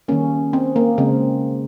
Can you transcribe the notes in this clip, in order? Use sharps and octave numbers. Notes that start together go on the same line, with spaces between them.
D#3 G3 A#3 C#4
C4
A#3
C#3 G#3 C4